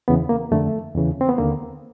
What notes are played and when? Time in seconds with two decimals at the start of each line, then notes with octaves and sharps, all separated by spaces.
0.08 E2 C#3 E3 B3
0.29 A#3
0.51 F2 D3 A3
0.95 E2 C#3 E3
1.21 C4
1.29 B3
1.38 D#2 D3 A#3